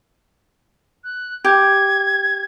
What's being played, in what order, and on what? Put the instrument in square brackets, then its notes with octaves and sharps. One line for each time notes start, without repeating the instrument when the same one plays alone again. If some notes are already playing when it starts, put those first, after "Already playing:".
[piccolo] F#6
[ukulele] G4 [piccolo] G#6